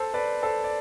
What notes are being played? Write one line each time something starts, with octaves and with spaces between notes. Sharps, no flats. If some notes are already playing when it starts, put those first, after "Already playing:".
Already playing: A4 C5
B4 D5
A4 C5
D5